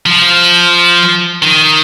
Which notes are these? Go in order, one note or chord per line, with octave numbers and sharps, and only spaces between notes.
F3
D#3